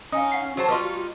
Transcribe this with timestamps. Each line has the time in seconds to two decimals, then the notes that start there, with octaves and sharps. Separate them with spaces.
0.12 C#4 D#4 F5 G#5 D#6
0.32 F5 F#5 C7
0.57 F#3 F#4 C5 A5
0.68 G3 D#4 F4 B4 C6